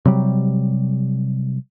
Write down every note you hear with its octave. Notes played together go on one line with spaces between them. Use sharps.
C3 F#3 G3